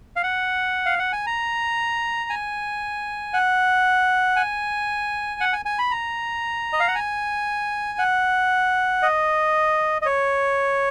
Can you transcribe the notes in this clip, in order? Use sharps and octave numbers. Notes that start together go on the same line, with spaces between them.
F5
F#5
F5
F#5
G#5
A#5
G#5
F#5
G#5
F#5
G#5
G#5
B5
A#5
D#5
F5
F#5
G#5
F#5
D#5
D#5
C#5